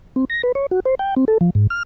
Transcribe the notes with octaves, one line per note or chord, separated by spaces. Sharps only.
C4
A#6
B4
C#5
F#4
C5
G5
C4
A4
F3
G#2
F6